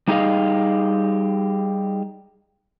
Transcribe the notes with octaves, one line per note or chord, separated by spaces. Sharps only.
G3 D#4 G4 G#4 D#5 F5